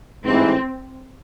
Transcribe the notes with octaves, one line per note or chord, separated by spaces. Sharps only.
A1 G#2 E3 C4